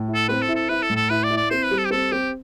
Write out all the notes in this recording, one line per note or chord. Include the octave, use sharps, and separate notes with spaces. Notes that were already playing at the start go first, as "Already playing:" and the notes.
Already playing: A2
E4
A4
C4 B4
A4
E4
A4
E4 B4
A4
A2
A4
E4 B4
D5
E4
D5
C4 C5
B4
G3
A4
G4
C4 A4
C4 G4